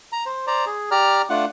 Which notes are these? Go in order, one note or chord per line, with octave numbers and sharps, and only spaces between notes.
A#5
C5
C5 D5 A#5
G#4
G4 D5 A#5 F6
A3 D4 F4 F#5